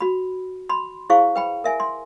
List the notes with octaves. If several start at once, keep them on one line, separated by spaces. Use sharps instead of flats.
F#4 B5
B5 C6
E4 G#4 C5 F5 C#6
B4 G5 B5
A#4 E5 G#5
C6